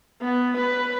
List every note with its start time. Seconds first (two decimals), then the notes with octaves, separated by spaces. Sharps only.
0.22 B3
0.58 B4